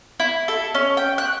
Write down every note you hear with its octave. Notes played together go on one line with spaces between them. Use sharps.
E4
A4
C#4
G5
F#6